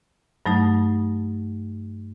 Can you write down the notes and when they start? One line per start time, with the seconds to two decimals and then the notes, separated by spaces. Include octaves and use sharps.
0.46 G2 F#3 A3 D#4